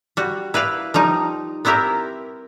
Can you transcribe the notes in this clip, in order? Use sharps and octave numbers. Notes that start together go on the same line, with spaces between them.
G3 F#4
E4 B4 D5 F5
F3 G3 D#4
B3 C4 E4 G4 A#4